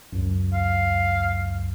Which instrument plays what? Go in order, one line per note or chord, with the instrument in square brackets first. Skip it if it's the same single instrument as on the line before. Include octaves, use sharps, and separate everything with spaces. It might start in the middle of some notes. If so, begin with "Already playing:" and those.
[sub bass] C#2 [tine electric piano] F#2
[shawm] F5